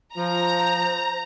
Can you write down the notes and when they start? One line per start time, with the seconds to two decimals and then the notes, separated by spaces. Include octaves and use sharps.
0.16 F3 C5 A#5